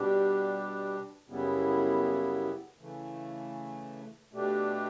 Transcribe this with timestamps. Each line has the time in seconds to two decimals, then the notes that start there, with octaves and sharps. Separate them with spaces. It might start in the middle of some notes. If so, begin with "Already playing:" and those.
Already playing: B2 G3 D4 G4
1.28 F#2 C#3 G3 B3 E4
2.80 C#3 E3 A3
4.33 B2 A3 D4 G4